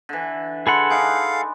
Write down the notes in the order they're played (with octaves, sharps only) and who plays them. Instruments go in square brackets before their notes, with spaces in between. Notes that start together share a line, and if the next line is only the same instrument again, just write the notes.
[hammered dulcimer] D3 E3
[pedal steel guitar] G#4 A4 F#5 [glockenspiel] B5 C6
[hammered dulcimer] D4 D#4 [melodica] F5 [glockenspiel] G#5